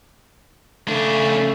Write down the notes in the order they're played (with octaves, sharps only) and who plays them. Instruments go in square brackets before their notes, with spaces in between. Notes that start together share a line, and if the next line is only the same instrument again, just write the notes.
[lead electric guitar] C#3 D4 [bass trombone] A3